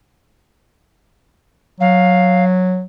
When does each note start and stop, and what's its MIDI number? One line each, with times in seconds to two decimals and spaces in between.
1.80 2.84 54
1.80 2.44 77